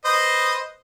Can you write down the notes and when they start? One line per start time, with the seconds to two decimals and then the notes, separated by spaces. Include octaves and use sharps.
0.05 B4 C5 D#5